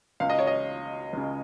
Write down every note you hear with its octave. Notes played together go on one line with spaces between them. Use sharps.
C#2 C#3 F5
D#5
C#5
D#5
C#2 C#3